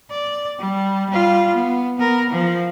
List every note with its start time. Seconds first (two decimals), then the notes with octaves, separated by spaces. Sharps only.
0.11 D5
0.59 G3
1.09 G3 F4
1.55 B3
1.98 B3 A#4
2.30 F3